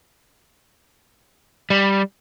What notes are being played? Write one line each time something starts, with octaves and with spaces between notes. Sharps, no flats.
G3